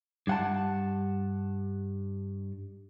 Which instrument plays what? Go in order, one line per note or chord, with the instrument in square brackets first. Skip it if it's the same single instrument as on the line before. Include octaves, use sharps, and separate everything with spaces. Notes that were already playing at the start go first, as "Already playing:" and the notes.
[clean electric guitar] G2 F#5 A5